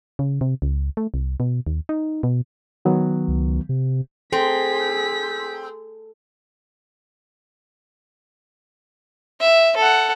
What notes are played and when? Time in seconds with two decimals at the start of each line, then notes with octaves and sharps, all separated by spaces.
0.19 C#3
0.41 C3
0.62 C#2
0.97 A3
1.14 C2
1.40 B2
1.67 D#2
1.89 D#4
2.23 B2
2.85 D#3 F#3 B3
3.28 C#2
3.69 C3
4.32 C4 G#4 A4 B6
9.40 E5
9.77 A4 F#5